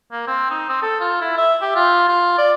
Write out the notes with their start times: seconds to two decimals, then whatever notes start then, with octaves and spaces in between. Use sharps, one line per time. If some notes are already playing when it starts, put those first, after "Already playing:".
0.12 A#3
0.27 C4
0.50 D#4
0.69 C4
0.83 A4
1.00 F4
1.21 E4
1.38 E5
1.62 G4
1.75 F4
2.08 F4
2.38 D5